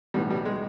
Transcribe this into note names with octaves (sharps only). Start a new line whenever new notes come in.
B1 A2 E3 G3
G3
G#3